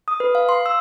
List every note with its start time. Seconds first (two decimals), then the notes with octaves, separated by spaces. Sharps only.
0.08 D#6
0.20 B4
0.35 F5
0.49 C6
0.66 E6